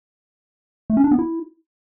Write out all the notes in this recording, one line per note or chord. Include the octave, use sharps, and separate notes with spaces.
A3
C#4
D4
B3
E4